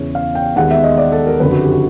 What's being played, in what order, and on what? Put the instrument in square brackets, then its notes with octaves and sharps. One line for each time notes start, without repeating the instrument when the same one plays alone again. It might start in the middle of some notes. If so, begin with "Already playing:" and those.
Already playing: [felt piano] E2 C#3 E3 C#5
F5
G5
D#2 D#3 G#3 B3 F#5
E5
D#5
D5
A4
A#4
F#1 F2 D3 B4
F#4
G4
F#4